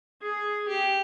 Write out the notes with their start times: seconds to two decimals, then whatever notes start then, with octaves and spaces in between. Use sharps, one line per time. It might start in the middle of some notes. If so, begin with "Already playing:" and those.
0.22 G#4
0.68 G4